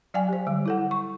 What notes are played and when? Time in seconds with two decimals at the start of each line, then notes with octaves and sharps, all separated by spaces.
0.14 F#3 D5 F5 G5 G#5
0.29 G4 C5
0.46 D3 G3
0.66 E4 A4 F#5
0.91 C#6